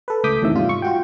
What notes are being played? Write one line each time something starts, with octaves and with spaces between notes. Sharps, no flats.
A4 B4
C#2 A3 D6 D#6 G6 B6
E2 A2 C3 D#3 E5
G#2 C3 G3 F4
C#6
F4 F#4 G5